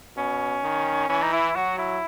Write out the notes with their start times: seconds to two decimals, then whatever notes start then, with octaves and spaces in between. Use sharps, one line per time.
0.17 B2 C#4
0.63 D#3
1.09 E3 C#4
1.23 D#4
1.33 E4
1.56 F#3 F#4
1.78 E4